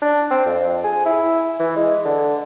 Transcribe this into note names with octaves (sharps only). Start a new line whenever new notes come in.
D4
C4
F2
G#4
E4
E3
G#3
D3